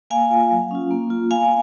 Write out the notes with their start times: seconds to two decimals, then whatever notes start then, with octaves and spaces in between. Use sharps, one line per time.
0.10 A#3 F5 G#5
0.30 F4
0.51 F#3
0.71 C#4 F4
0.91 A#3
1.10 F4
1.31 B3 F5 G#5